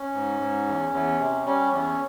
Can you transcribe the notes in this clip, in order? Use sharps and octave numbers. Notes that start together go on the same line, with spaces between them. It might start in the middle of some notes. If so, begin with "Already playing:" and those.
Already playing: C#4
G#2
G#2
E2
E2
C3
G3 C#4
E2 C#4